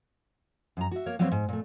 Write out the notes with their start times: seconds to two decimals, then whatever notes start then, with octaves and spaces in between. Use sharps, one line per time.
0.77 F#2 A#5
0.91 F#4 E5
1.06 A#3 A#4 C#5
1.19 F#3 G3 A#3 C4 B4 C#5
1.32 G#2
1.49 A#2 A3